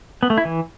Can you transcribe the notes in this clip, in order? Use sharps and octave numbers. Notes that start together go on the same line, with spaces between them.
B3
A3
E4
E3